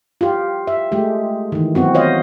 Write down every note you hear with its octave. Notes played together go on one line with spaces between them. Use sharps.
F4 G4
E5
G#3 A3 G4
D#3 E3
F#3 B3 C4 F#4
F4 C5 C#5 D#5 F5